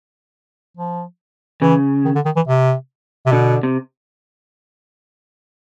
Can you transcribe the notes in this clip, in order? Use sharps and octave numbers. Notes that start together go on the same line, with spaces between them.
F3
C#3 E3
D#3
D3
D#3
E3
C3
C3
B2 D3
C3